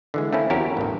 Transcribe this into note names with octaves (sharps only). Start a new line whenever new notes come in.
D3 E3 G#3
A3 A#3 C4 C#4 E4
E2 C#4 E4 F#4 G4 A#4
A1 G2